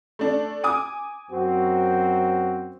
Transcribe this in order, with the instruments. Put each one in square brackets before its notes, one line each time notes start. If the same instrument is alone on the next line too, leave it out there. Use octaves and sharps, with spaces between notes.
[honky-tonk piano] A3 D4
G#5 D6 D#6
[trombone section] F#2 C4 F#4